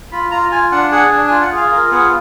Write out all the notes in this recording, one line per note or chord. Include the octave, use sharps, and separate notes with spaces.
F4 B5
F4 A#5
F4 G#5
D4 F#5
G#4 F#5
D4
F4 G#5
F#5
G#4 F5
F4 A#4
B3 G#4